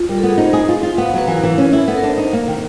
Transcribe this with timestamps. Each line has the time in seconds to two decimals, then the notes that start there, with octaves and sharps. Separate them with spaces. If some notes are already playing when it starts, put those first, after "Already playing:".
Already playing: F4
0.09 G3 A#4
0.18 A4
0.23 B3
0.29 G#4
0.38 D#4 C5
0.53 G#4
0.69 F4
0.83 F4
0.98 B3 F5
1.08 F5
1.14 F#3 B4
1.27 E3 A#4
1.43 E3
1.58 C#4
1.73 E4
1.88 B3 A4
1.97 A#4
2.03 D4 C5
2.18 D#4 C5
2.33 A#3
2.48 D#3